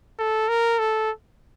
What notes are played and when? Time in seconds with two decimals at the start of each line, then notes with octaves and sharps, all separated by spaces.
0.19 A4
0.48 A#4
0.79 A4